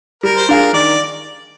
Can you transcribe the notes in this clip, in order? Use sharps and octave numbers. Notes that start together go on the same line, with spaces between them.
G3 A#4
C5
D4 F4 G#4 A#4
D#3 D5